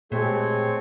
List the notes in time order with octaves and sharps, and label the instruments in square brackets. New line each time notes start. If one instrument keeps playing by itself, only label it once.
[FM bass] A#2 [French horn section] G#3 G4 G#4 [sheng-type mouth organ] A3 C4 C#5